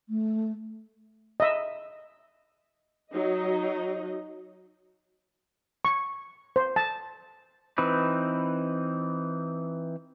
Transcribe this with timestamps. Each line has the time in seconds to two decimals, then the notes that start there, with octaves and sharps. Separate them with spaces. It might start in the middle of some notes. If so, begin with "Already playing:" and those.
0.09 A3
1.40 D#5 E5
3.14 F#3 D#4 D#5
5.85 C#6
6.56 C5
6.76 A5
7.78 E3 C4 D#4 B4